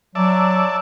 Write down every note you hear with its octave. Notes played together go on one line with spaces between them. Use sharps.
F#3 D5 E5 A5